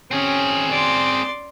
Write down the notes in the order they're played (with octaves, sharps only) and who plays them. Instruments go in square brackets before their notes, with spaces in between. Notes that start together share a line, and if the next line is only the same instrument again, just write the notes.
[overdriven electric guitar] C4 G#4 [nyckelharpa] C#4
[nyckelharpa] D5 C6